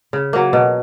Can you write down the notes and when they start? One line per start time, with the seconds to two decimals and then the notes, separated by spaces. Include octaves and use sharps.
0.13 C#3
0.33 F#3 A#3
0.53 B2